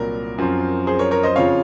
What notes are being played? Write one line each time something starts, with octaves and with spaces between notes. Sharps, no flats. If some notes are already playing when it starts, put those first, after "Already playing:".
Already playing: C2 A#2 F#3 A#4
F#2 F3 C4
G#4 C5
A#4 C#5
A#4 C#5
C5 D#5
F2 C#3 F3 C#5 F5